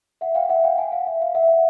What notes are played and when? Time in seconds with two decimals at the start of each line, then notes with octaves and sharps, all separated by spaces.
0.21 E5 F#5
0.35 F5 G5
0.49 E5 F#5
0.64 F5 G5
0.78 F#5 G#5
0.92 F5
1.07 E5
1.22 F5
1.35 E5 F#5